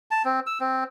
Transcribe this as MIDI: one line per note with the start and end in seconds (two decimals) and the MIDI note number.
0.11 0.22 81
0.25 0.40 60
0.47 0.58 88
0.60 0.84 60